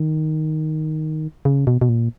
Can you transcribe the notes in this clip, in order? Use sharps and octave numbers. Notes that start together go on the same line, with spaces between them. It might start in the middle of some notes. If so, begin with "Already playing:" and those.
Already playing: D#3
C#3
B2
B2
A#2